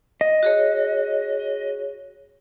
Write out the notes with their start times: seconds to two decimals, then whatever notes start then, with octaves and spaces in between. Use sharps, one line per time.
0.21 D#5
0.43 F#4 G#4 C#5